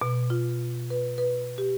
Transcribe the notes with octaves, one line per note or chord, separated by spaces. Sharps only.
B2
F4
B4
B4
G4